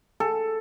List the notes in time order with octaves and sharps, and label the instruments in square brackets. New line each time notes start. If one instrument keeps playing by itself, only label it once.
[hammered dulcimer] A4